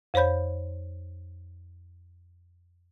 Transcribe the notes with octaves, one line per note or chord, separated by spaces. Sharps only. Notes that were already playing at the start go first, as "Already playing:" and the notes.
F2 C5 C#5 B5 G6